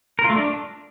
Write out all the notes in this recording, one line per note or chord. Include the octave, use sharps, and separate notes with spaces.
A#4
F4
A3
D4